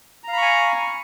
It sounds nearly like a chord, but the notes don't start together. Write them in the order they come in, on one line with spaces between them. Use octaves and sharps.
A#5 F5 B5 C#6 G#5